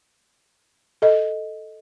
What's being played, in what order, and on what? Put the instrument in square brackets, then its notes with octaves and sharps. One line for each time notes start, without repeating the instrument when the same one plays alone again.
[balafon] A4 D#5